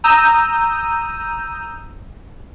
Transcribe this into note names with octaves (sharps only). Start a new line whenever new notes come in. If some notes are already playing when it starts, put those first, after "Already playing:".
A#5 D#6 E6 G6 D#7